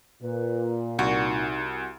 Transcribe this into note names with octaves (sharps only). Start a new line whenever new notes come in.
A#2 B4
C2 D#4 F#4